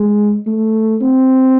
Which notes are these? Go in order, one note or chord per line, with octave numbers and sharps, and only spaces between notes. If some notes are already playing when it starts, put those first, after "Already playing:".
Already playing: G#3
A3
C4